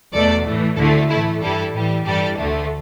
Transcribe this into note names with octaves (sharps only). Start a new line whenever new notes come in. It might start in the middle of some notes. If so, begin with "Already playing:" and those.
E2 B2 A3 A4 D5
A2 E3 A3
D2 D3 A3 E4 A4
A2 E3 A3 E4
G2 E3 G3 E4 A4
A2 E3 G3
G2 E3 G3 A4 D5
D2 D3 A3